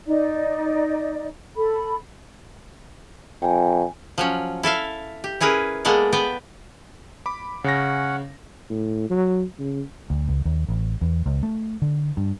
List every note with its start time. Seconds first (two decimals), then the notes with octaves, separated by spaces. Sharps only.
0.07 D#4 D5
1.56 A4 B5
3.42 F2 G5 G#5
4.18 F3 F#3 C#4
4.63 E4 A4 E5 F5
5.24 G4
5.40 C#4 E4 G#4 A#4 B4
5.85 G#3 A#3 B3 A4 D5
6.13 B3 B4 G5
7.26 B5 D6
7.64 C#3 C#4 F#5 A#6
8.70 A2
9.10 F#3
9.59 C#3
10.10 D2
10.29 C#2
10.45 D#2
10.68 A1
11.01 E2
11.26 C#2
11.43 A3
11.82 D3
12.17 G2